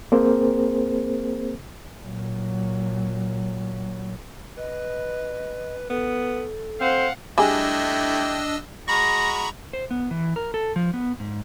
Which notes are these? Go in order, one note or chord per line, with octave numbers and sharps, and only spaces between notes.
A#3 C4 G#4 A#4 C5
A#2 F#3
B4 D#5
B3 A4
C4 C5 F5 F#5
G3 A3 D4 E4 G4 G#4 D#5 E6
G#3 F#4 A#5 B5 C#6 A#6
C5
B3
E3
A#4
A4
F3
B3
G#2